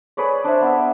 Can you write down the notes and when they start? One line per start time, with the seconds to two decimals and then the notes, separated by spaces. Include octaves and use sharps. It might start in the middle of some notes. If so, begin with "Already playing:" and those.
0.17 G#4 B4 C#5 D5
0.44 D4 C5 E5
0.61 B3 E5